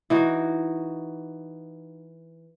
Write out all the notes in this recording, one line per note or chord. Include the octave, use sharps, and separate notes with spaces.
E3 D#4 F#4